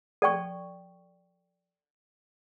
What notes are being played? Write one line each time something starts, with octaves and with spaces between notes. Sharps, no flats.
A4 D5 G5 C#6